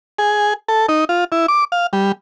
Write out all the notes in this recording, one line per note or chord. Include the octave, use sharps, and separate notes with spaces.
G#4
A4
D#4
F4
E4
D6
F5
G3